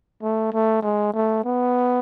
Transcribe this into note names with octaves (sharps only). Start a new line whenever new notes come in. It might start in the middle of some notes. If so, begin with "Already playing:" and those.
A3
A3
G#3
A3
B3